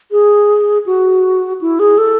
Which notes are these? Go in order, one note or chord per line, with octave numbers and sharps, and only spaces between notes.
G#4
F#4
E4
G#4
A4